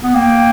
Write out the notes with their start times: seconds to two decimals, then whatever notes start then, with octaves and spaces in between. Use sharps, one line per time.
0.03 B3
0.14 A#3 G5